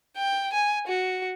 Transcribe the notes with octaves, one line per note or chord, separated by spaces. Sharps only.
G5
G#5
F#4